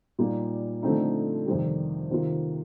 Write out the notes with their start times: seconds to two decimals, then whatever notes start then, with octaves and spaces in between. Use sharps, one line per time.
0.18 A#2 G3 A#3 D#4
0.83 D3 F3 A3 C4 D#4
1.46 F2 C3 D#3 G3
2.10 C3 D#3 A#3 F4